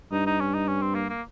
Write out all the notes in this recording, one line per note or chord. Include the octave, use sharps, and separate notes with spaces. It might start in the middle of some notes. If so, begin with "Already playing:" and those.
G2 D#4
D#4
C#4
D#4
C#4
C4
A#3
A#3